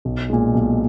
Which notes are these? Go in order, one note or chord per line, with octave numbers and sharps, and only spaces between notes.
B1
A#2 G#3
B1